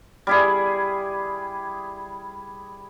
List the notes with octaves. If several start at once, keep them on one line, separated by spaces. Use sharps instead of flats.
G3 E4 G#4